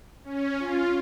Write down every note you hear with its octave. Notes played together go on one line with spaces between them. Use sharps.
C#4
F4